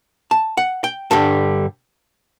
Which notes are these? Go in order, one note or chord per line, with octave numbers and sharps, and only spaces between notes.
A5
F#5
G5
G2 D3 G3 A5